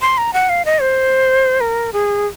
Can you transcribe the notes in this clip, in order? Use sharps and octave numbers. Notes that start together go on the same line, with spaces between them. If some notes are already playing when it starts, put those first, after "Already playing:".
C6
A#5
F#5
F5
D#5
C5
A#4
G#4